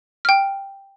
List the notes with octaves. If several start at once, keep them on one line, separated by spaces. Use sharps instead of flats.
G5 F6